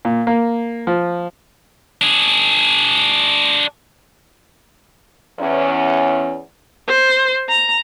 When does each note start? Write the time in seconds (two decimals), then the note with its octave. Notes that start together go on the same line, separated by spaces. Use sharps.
0.05 A#2
0.27 A#3
0.87 F3
2.02 D4 G#4
5.40 E2 C#4
6.87 C5
7.49 A#5